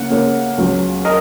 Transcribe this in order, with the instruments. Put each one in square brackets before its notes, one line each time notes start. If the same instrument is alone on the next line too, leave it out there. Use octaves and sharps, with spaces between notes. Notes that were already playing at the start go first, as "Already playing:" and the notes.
Already playing: [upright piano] C#3 A#3 C#4 [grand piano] F#5
[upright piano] C#3 A#3 C#4
C#2 C#3 F#3 C#4
[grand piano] A#4 D#5